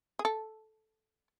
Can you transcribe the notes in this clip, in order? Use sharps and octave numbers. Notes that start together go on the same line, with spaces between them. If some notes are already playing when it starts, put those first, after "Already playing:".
G#4
A4